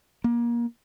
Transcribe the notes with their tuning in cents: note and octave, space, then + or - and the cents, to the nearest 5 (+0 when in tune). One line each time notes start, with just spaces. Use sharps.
A#3 +25